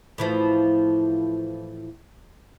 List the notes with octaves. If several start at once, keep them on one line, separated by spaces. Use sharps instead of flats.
A2 E3 F3